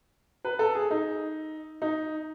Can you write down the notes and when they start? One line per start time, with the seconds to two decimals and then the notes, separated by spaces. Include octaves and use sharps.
0.45 B4
0.59 A4
0.75 G#4
0.91 D#4
1.82 D#4